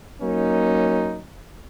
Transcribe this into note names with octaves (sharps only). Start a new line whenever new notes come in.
F#3 A#3 C#4 D#4